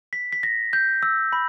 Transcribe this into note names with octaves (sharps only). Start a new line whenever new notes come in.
B6
B6
A#6
G6
E6
B5